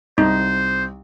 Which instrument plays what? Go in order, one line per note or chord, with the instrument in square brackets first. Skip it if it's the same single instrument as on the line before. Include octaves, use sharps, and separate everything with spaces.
[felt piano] C2 [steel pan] D#4 [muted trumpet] C5